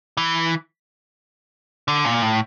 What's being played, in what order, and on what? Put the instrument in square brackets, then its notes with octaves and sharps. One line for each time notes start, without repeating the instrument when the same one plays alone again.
[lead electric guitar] E3
D3
A#2
A2